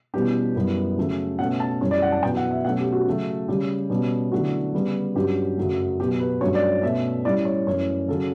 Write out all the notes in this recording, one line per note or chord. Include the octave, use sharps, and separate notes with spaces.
E2 B2 G3 C#4 G4
F#2 E3 G3 B3
C#3 F#3 A3 C#4
B2 A3 C#4 F#5
A5
F#2 E3 G3 C#4 C#5
D5
F#5
A5
E2 B2 F#3 B3 G5
F#5
E5
B2 F#3 A3 C#4 F#5
G4
F#4
C#3 F#3 A3
C#3 G3 C#4 G4
B2 G3 C#4
E2 D3 F#3 A3 F#4
C#3 G3 B3
G2 F#3 C#4 G4
F#2 C#3 F#3 A3
B2 F#3 B3 G4
B4
G2 F#3 A3 C#4 C#5
D5
C#5
B2 A3 C#4 E5
A2 G3 C#4 D5
C#5
F#2 E3 A3 C#4 C#5
C#3 F#3 C#4 A4